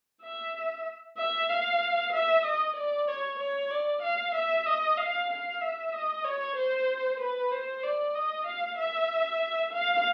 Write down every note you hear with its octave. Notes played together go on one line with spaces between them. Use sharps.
E5
E5
F5
E5
D#5
D5
C#5
C#5
D5
F5
E5
D#5
F5
F5
E5
D#5
C#5
C5
B4
C5
D5
D#5
F5
E5
F5